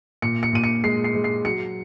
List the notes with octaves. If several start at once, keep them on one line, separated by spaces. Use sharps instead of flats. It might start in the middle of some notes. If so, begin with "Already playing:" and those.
A#2 C#7
C#7
A#2 D#7
C#7
G#3 C7
C7
G#3
C7
F#3 C#7